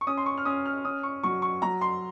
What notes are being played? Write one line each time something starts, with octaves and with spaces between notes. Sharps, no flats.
C#6
C#4 D#6
C6
C#6
F6
C#4 D#6
F6
C#4 D#6
C#6
F#3 C#6
C#6
F#3 A#5
C6